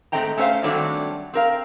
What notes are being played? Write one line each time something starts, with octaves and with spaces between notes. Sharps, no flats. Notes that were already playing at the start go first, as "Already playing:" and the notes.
G#2 A3 C4 D#5 G5 A#5
A3 C#4 F#4 C5 E5 F5
D#3 F#3 G3 A3 C4 D4
C4 A#4 F5